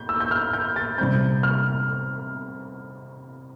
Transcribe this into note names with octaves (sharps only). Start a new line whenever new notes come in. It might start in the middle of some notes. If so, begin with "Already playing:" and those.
Already playing: G6
E6
G6
F6
G6
A6
C3 G3 C4 G6
F6